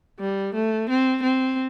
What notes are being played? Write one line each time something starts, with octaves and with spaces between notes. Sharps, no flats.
G3
A3
C4
C4